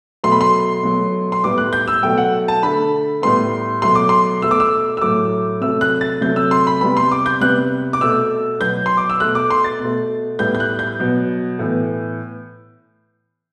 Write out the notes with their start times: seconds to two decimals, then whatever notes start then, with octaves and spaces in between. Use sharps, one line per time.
0.24 B2 F#3 A3 C6
0.32 B5
0.41 C6
0.83 B2 F#3 A3
1.32 C6
1.43 A2 G3 B3 D6
1.58 F#6
1.73 G6
1.88 E6
2.03 B2 F#3 A3 G5
2.18 F#5
2.48 A5
2.63 D3 A3 B5
3.22 A2 G3 B3 C6
3.82 B2 F#3 A3 C6
3.95 D6
4.09 C6
4.42 B2 A3 E6
4.51 D6
4.60 E6
4.97 E6
5.01 A2 F#3 A3 D6
5.61 C3 F#3 A3 E6
5.81 F#6
6.01 A6
6.21 C3 F#3 A3 G6
6.36 E6
6.51 C6
6.67 B5
6.81 C3 G3 B3 B5
6.97 C6
7.11 D6
7.26 G6
7.41 C3 G3 B3 F#6
7.93 D6
8.00 B2 A3 E6
8.60 B2 F#3 B3 G6
8.86 C6
8.97 D6
9.10 E6
9.20 B2 A3 F#6
9.35 D6
9.51 C6
9.64 A6
9.80 B2
9.85 A3
10.39 A2 G3 B3 G6
10.55 G6
10.60 F#6
10.79 G6
11.00 B2 F#3 B3
11.59 A2 E3 B3